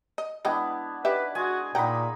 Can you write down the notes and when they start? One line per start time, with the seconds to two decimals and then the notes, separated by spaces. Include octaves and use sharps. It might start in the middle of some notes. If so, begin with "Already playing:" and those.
0.18 D#5
0.45 G#3 B3 D4 E4 D#5 G5
1.05 D#4 G4 B4 D5 E5
1.35 G#3 F#4 G#4 G#5
1.75 A#2 D#4 F#5 G5 B5